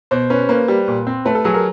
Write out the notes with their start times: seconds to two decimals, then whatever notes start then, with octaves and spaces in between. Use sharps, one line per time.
0.11 B2 C5
0.30 C#4 B4
0.49 A#3 B4
0.68 G3
0.88 A#2
1.07 C4
1.25 A3 B4
1.35 A4
1.44 F#3 G#4
1.54 A#4